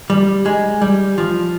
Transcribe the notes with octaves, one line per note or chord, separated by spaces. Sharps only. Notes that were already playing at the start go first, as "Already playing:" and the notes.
G3
G#3
G3
F3